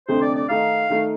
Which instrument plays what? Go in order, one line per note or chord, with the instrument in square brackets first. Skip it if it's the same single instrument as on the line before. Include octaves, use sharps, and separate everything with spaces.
[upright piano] F1 F2 D3 A3 C4 [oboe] C5
[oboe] D5
D5
[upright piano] D#3 A3 D#4 [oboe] F5
[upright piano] D#3 A3 D#4